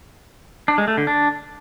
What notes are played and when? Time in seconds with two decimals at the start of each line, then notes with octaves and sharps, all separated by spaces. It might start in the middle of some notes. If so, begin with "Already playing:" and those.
0.68 D4
0.78 G#3
0.88 A3
0.97 D3
1.07 D4